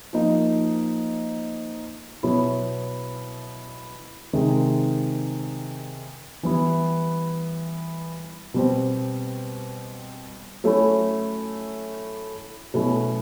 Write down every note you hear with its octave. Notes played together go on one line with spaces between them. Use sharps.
F3 A#3 D#4
B2 F#3 B3 E4
C3 D#3 G#3
E3 G3 B3 E4
B2 G3 C4
F#3 A3 C#4 E4
B2 F#3 A3 C#4 E4